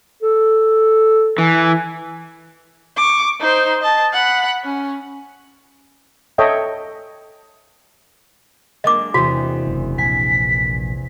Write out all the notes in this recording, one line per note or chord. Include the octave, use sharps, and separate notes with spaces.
A4
E3 G#5
C#6 D6
D#4 C5
D#5 A5
F#5 B5
C#4
A4 C#5 D#5 E5 G5
G#3 A#3 D4 D#5 D6
E2 C3 F#4
F#1
A#1 G#5 B6